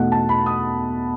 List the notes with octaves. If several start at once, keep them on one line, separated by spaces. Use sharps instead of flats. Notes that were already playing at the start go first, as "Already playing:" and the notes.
Already playing: E2 B2 A3 D#4 F#5
A5
B5
D#6